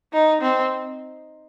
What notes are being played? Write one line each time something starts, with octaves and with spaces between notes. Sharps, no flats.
D#4
C4